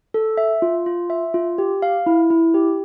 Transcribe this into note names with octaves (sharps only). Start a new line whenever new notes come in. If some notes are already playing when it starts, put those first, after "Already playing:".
A4
E5
F4
F4
E5
F4
G4
F5
E4
E4
G4